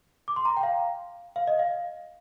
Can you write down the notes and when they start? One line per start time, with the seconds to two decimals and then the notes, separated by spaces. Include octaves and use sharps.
0.28 D6
0.36 C6
0.45 A#5
0.57 G5
0.63 F5
1.36 F5
1.47 D#5
1.59 F5